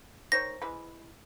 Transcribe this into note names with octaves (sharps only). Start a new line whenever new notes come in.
D#3 C5 C#5 A#6
E3 G#3 B4